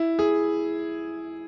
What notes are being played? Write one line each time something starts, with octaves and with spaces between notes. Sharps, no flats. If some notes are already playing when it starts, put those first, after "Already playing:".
Already playing: E4
G#4